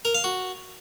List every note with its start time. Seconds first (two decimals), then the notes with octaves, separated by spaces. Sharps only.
0.05 A#4
0.14 F5
0.24 F#4